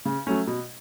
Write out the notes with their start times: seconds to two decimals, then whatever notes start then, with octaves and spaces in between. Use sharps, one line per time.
0.05 C#3
0.27 F#3 A3 C#4
0.47 B2